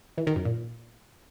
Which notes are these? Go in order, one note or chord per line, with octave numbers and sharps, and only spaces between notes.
E3
D#3
F#2
A#2